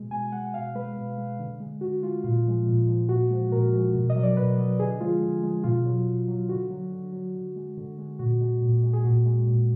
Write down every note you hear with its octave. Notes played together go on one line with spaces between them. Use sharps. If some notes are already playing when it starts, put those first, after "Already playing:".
Already playing: B2 G#3
B2 G#5
G#3 F#5
B2 F5
G#3 B4
B2
G#3
D3
G#3
D3 F#4
G#3 F4
A#2 F4
F3 G#3
A#2
F3 G#3
A#2 F#4
F3 G#3
A#2 A#4
F3 G#3
B2
D#5
F#3
D5
B2 B4
F#3
D3 G#4
F3 G#3 F4
D3
F3 G#3
B2 F4
F#3
B2
F#3
D3 F#4
F#3
D3
F#3
D3
G#3
D3
G#3
A#2 F#4
G#3
A#2
G#3
G#4
A#2 F#4
G#3
A#2